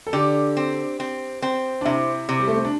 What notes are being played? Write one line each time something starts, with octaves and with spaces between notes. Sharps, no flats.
A4
D3 G4
C4
C4
C4
D4
C3 E4
C3
G3
A3
C4
D4